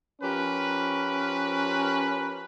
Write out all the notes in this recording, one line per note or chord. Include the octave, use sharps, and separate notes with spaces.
F3 C#4 G4 A#4 B4